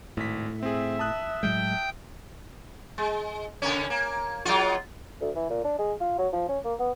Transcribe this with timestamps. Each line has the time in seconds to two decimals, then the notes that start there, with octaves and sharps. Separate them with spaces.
0.17 G#1 A2 B6
0.63 C4 G#4 E5
0.99 A5 D#6 F#6
1.43 A2 F#3 G#3 G5
2.98 G#3
3.62 C#3 A#3 C#4
3.90 A#3
4.45 F#3 G#3 F4
5.21 D2
5.35 E3
5.50 A#2
5.64 D4
5.79 G#3
6.01 F4
6.18 F#3
6.33 F3
6.49 C#4
6.64 A#3
6.80 B3